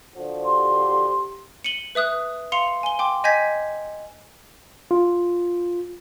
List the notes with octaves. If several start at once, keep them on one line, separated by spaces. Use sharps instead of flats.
D3 F3 F#4
G4 C6
C#7 D#7 F#7 G7
B4 E5 D#6 F#6
F5 C6 C#7 F7
G#5 G7
G5 C6 D6
D#5 G#5 G6 G#6 A#6 B6
F4